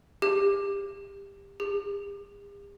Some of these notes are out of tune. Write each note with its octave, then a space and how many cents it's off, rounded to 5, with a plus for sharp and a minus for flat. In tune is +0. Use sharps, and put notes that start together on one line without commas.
G4 +25
G4 +45